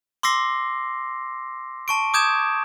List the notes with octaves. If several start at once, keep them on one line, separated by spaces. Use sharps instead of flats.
C6 D6 E6 A#6 C7
A5 C#6 D7
D6 D#6 G6 G#6 E7